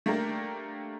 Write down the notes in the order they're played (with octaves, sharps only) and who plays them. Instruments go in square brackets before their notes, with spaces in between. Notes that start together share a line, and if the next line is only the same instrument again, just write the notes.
[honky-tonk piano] A3 A#3 D4 G4 A#4